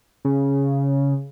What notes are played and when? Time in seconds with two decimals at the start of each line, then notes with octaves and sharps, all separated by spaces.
0.25 C#3